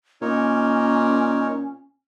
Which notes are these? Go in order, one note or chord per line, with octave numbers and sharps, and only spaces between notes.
A#2 C#4 D#4 A#4 C#5